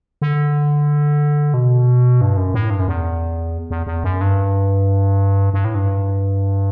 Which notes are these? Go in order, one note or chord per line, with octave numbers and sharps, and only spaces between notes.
D3
B2
G2
F#2
A2
G2
F#2
E2
E2
E2
F#2
G2
G2
A2
G2